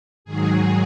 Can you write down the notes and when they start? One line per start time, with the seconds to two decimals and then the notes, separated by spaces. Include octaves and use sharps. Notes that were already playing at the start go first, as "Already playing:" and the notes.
0.25 G#2 D#3 F#3 G#4